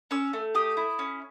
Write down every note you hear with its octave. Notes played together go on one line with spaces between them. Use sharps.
C#4 E6
A3
G4 D#6
E4
C#4